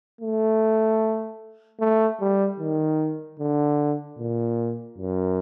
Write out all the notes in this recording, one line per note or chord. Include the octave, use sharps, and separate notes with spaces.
A3
A3
G3
D#3
D3
A#2
F#2